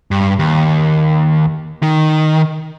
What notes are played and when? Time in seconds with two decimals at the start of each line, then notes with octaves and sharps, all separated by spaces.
0.11 G2
0.39 D#2
1.83 D#3